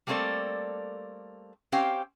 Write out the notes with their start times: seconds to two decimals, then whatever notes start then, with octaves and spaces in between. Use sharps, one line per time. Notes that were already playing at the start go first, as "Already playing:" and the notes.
0.07 G3 A3 A#3 C4 A4 D5
1.72 C4 C#4 G4 C5 F5 G5